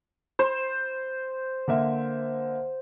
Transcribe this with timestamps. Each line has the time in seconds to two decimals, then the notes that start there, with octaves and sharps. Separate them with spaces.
0.39 C5
1.68 D3 A#3 E5